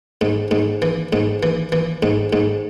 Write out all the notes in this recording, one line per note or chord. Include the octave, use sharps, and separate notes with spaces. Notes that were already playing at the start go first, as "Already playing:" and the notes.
G#2
G#2
E3
G#2
E3
E3
G#2
G#2